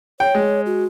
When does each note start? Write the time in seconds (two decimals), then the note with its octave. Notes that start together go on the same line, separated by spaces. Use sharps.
0.20 C#5 G5
0.35 G#3
0.66 F#4